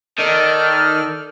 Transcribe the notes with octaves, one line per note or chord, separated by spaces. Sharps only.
D#3 A4 D5 F6